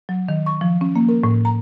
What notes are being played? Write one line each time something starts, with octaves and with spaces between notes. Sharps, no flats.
F#3
D#3
C#6
F3
C#4
A#3
A#4
A2
A#5